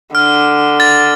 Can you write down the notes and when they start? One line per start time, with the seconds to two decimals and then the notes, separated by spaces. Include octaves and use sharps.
0.15 D3 F6
0.80 A6